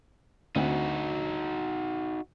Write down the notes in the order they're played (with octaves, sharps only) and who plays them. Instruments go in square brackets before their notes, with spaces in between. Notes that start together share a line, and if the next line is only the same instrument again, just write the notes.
[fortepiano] D2 C4 [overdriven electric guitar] D#4 F#4